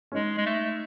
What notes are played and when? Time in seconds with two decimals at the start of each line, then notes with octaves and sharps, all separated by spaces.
0.12 C#4
0.15 G#3 D#4
0.38 G#3
0.46 A3